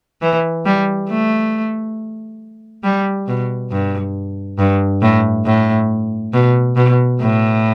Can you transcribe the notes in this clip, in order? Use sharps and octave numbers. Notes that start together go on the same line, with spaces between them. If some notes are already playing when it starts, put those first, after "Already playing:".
E3
G3
A3
G3
B2
G2
G2
A2
A2
B2
B2
A2